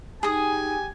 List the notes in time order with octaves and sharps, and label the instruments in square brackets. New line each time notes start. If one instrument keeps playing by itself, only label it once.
[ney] D#4 [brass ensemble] G4 G#5 [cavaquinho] G#4 D#6